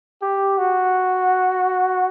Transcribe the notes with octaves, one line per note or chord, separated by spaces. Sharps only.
G4
F#4